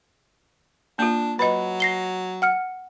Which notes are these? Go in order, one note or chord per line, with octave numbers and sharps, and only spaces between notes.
A#3 D4 F4
F#3 B4 D#5 B5
A#6 C7 G7
F#5 F6 C#7